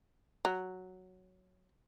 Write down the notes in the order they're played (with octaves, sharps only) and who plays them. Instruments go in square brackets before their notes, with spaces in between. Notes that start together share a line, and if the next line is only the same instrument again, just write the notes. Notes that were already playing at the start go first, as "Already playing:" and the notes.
[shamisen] F#3